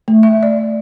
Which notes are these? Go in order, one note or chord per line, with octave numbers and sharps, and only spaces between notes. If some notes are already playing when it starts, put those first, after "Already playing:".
A3
E5
D5